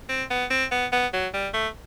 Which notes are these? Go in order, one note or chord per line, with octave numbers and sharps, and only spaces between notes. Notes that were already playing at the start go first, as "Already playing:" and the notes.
C4
B3
C4
B3
B3
F#3
G3
A3